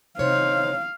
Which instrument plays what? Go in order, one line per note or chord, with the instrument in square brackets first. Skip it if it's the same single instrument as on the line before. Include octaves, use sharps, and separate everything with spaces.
[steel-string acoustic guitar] C3 C#5 [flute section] D#4 C5 [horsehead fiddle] F5